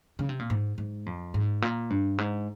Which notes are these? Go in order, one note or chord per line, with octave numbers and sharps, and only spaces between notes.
C#3
C3
A#2
G#2
G#2
F2
G#2
A#2
G2
G#2